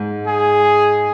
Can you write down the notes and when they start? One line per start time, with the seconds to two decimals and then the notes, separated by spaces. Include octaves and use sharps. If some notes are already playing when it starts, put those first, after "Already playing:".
Already playing: G#2
0.26 G#4